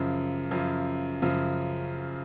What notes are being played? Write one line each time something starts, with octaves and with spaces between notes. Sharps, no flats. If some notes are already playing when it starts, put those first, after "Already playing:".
Already playing: F#2 C#3 F3
F#2 C#3 F3
F#2 C#3 F3